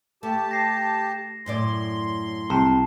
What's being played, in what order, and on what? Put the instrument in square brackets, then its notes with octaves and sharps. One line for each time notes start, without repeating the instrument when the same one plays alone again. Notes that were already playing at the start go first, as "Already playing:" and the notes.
[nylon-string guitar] A3 [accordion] G4 A5
[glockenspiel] A#6 C7
[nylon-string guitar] F#2 A2 D5 [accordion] C6
[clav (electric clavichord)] C2 [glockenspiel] A5 C7 E7